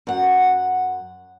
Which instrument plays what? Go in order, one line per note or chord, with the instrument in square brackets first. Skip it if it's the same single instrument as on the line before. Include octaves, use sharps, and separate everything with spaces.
[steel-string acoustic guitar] F#2 F#5